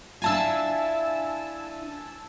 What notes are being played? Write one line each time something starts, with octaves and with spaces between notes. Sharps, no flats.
D4 E4 F4 G#5 A5 E6